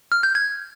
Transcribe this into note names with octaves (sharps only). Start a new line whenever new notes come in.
F6
G6
G#6